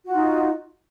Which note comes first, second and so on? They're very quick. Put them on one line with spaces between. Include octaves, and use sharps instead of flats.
F#4 F4 D#4